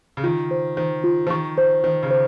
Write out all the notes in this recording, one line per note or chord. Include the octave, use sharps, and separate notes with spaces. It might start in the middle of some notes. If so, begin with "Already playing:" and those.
C#3
D#3 F4
C5
D#3 C5
F4
F3
D#3 C#6
C5
D#3 C5
C#3
C5